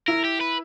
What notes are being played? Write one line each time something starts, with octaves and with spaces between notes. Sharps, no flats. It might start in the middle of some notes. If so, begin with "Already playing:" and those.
E4 A#4
G4
B4